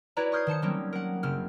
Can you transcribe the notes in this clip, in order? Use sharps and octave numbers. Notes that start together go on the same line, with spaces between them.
E4 F#4 B4 C#5 D5 A#5
C#6 D#6 F6 G6 G#6 C7
D#3 C5 A5 C#7
F#3 G3 A#3 C4 C#4
A#4 F#5
F#1 C#3 C4 F6